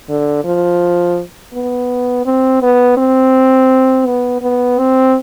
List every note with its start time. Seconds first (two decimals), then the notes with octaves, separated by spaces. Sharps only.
0.09 D3
0.44 F3
1.53 B3
2.25 C4
2.62 B3
2.97 C4
4.06 B3
4.42 B3
4.78 C4